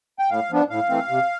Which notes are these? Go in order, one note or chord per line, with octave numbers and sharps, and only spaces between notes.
G5
A2 F5
F3 B3 D4
A2 F5
E3 A3 C4
C3